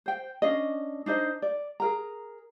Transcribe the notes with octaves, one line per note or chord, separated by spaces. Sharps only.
C5 G5
C#4 D4 D#5
D4 D#4 C5 D#5
D5
G#4 A#4 A#5